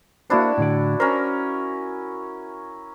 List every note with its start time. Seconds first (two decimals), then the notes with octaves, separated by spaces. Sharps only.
0.30 A#3 D4 E4 F#4 C5
0.58 A2 D3 D5
1.00 C#4 A#4 C5